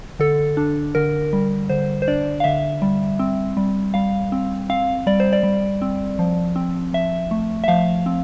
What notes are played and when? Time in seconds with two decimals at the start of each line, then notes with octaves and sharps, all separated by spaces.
0.19 D3 A4
0.57 D4
0.95 D3 A#4
1.33 G3
1.69 D3 C5
2.02 C5
2.08 D4 D5
2.40 F5
2.44 D3 E5
2.82 G3
3.19 C4
3.57 G3
3.94 G3 F5
4.32 C4
4.70 C4 F5
5.07 G3 D5
5.20 C5
5.33 D5
5.43 G3
5.82 C4
6.19 F3
6.56 C4
6.93 F3 E5
7.31 A3
7.64 E5
7.68 F3 F5
8.06 C4